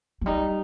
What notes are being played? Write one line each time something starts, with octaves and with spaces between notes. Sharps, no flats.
F#3
G3 D#4